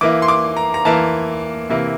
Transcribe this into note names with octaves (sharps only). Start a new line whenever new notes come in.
E3 A#3 E4 D6
C6
D6
A#5
A#5
E3 A#3 E4 A5
C3 E3 A#3 E4